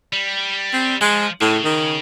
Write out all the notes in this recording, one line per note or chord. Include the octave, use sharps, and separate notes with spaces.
G3
C4
F3 G#3
A2 C#3
D#3